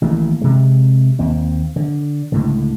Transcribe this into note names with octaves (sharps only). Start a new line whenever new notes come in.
A1 D#3 A#3
C3 G#3
D#2 A#3 C4
D3
C#2 A2 D3